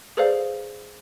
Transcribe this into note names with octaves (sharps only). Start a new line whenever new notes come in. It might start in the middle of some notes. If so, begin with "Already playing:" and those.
G#4 A4 B4 C5 D5 F5